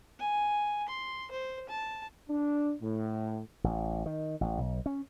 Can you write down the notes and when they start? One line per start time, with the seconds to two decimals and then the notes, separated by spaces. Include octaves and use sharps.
0.19 G#5
0.88 C6
1.31 C5
1.69 A5
2.28 D4
2.81 A2
3.64 A1
4.06 D#3
4.41 A1
4.58 B1
4.86 C#4